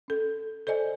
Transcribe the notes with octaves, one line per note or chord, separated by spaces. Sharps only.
C#4 A4
A4 C5 D5 D#5 G#5